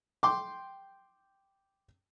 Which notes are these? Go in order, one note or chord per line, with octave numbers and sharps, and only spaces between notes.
G5 C6 D6